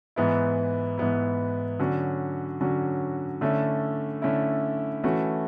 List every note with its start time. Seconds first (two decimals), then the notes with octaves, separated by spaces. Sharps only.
0.16 G#2 E3 B3 E4
0.98 G#2 E3 B3 E4
1.79 D3 F#3 C#4 F#4
2.61 D3 F#3 C#4 F#4
3.41 D3 A3 C#4 E4
4.22 D3 A3 C#4 E4
5.04 E3 A3 C#4 F#4